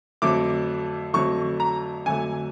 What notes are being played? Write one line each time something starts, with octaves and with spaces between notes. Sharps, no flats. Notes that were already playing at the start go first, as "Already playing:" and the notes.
F2 D3 F#3 A3 D6
F2 D3 F#3 A3 C#6
A#5
F2 D3 F#3 A3 G#5